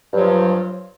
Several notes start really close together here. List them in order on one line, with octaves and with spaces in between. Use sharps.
G2 F#3 F3